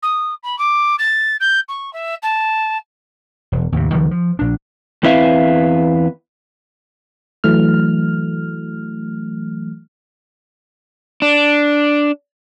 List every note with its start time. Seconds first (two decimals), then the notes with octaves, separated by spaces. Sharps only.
0.02 D#6
0.43 B5
0.58 D6
0.99 A6
1.40 G6
1.68 C#6
1.93 E5
2.22 A5
3.52 E1
3.72 D#2 A2 C3
3.92 C#2 D#3 F3 G3
4.11 F3
4.39 A#1 D4
5.03 E2 C4 E4 B4 E5 F5
7.44 E3 F#3 A3 F6
11.22 D4